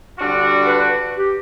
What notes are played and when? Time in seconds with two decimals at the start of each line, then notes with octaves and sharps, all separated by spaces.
0.18 D3 G3 D4 F#4
0.67 B4
1.17 G4